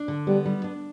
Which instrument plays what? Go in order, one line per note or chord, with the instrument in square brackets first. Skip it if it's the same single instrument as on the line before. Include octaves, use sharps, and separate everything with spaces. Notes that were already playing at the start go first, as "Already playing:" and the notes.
Already playing: [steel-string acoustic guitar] D4
D3
[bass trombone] G3 [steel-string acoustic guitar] B3
[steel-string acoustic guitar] G3
D4